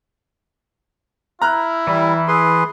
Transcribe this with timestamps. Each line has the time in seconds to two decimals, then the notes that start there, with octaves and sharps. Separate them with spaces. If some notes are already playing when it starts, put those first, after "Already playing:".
1.42 E4 A#5 F6 F#6
1.87 E3 G3
2.28 G#4 B4 C6